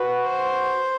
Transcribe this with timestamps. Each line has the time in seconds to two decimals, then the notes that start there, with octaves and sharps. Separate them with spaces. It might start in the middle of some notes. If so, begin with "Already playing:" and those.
Already playing: F#4 B4
0.27 C5